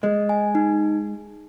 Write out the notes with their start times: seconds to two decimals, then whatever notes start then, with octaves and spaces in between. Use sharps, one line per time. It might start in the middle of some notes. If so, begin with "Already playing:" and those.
0.03 G#3 D#5
0.29 G#5
0.55 D#4